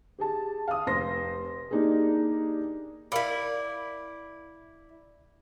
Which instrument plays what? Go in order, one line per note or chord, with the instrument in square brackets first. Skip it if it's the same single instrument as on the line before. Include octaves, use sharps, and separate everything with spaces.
[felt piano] G4 G#4 A5
F5 D#6
F1 C5 C6 A#6
A#3 D4 D#4 G4 G#4
[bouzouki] E4 D5 [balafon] A#4 F5 B5